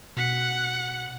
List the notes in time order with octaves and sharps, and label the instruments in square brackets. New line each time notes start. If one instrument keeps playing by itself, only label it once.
[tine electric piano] B2 B6 C#7 [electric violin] F#5